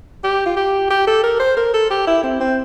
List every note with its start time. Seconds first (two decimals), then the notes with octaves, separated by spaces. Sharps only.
0.24 G4
0.46 F4
0.56 G4
0.90 G4
1.07 A4
1.23 A#4
1.40 C5
1.57 A#4
1.74 A4
1.90 G4
2.07 E4
2.23 C4
2.40 C4